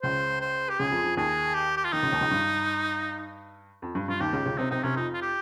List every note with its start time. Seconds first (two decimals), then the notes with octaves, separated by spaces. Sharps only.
0.03 C#2 C#3 C5
0.41 C5
0.69 G4
0.79 C#2 C#3 G#4
0.91 F2 F3
1.04 F2 F3
1.17 D#2 D#3 G#4
1.54 G4
1.77 G4
1.85 F4
1.93 D#2 D#3 D#4
2.02 C#2 C#3
2.12 D#2 D#3
2.21 C#2 C#3
2.31 G2
3.82 F2
3.95 G2
4.08 G2 F4
4.20 D#2 D#3 G4
4.33 C#2 C#3
4.46 C#2 C#3
4.58 C3 C4 D#4
4.71 C3 C4 D#4
4.83 C3 C4 C#4
4.96 F2 F3 D#4
5.14 F4
5.22 G4